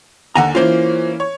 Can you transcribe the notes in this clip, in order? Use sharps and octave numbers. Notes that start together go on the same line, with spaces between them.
D#2 D3 F#5 G#5 A#5
E3 A#3 C#4 F4 C5
C#5